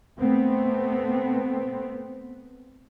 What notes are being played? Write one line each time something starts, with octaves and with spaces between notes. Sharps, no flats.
A3 B3 C4